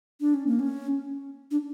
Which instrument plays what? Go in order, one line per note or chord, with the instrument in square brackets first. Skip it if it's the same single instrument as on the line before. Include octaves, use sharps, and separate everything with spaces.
[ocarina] D4
C#4
A#3
C#4
D4